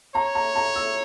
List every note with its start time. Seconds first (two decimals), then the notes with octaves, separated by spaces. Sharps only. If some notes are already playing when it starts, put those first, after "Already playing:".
0.15 C#5 A#5
0.35 A#5
0.56 A#5
0.76 E6